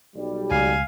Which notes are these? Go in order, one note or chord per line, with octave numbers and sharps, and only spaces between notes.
B1 G3
C#2 F5 G#5